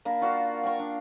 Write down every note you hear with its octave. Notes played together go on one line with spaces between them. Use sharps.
A#3 D4 A#4 B5
F4 F#4 D5 F5
G5 A#5 C#6
D4